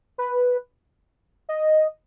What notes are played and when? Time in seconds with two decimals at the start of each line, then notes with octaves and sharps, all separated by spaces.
0.18 B4
1.49 D#5